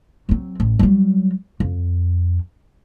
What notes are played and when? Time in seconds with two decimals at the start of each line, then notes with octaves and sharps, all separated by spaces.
0.29 F#3 C4
0.60 A1
0.79 F#3 G3
1.60 F2